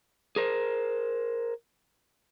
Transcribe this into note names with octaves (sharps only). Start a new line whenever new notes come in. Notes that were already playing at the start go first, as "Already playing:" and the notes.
G#4 A#4 C5